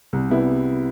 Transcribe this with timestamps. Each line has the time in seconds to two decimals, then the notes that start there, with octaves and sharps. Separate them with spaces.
0.13 C2
0.30 C3 G3 B3 E4